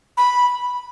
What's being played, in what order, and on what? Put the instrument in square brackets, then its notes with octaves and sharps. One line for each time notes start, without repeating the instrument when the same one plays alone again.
[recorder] B5